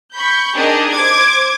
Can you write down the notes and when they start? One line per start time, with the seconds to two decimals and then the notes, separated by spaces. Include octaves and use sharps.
0.14 B5 C#6 G6
0.55 D4 D#4 G4 G#4 A#4 D#5
0.92 C5 D6 G#6